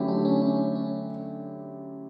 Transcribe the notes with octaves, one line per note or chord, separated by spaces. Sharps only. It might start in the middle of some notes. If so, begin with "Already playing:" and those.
Already playing: D3 F#3 A3 C#4 E4 G4
D4
C#4
C#4
C#4